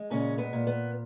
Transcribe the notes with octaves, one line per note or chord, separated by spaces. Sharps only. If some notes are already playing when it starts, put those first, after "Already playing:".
Already playing: G#3
A#2 C#3 C#4
B3
A#2
B3